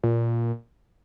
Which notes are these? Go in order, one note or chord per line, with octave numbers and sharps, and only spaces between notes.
A#2